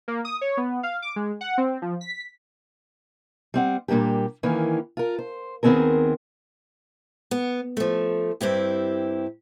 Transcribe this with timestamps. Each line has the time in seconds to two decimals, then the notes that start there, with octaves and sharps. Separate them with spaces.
0.08 A#3
0.25 D#6
0.41 C#5
0.57 B3
0.83 F5
1.02 D6
1.16 G#3
1.41 F#5
1.58 C4
1.82 F3
2.01 B6
3.54 G3 C4 F#5
3.88 A#2 G3 A#3 D4 G4
4.43 D#3 E3 A#3 C#4
4.97 F4 A#4
5.19 C5
5.63 D#2 D#3 B3 C4 G#4 A#4
7.31 B3
7.77 F3 A3
8.41 G2 C4 E4 G4